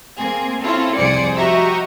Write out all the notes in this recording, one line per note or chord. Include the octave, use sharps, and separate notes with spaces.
A#3 C4 G#4
C4 C#4 E4 F4 A4
C2 F2 G#4 C5 D5 C#7
F#4 G4 D#5 E5 A#5 C#6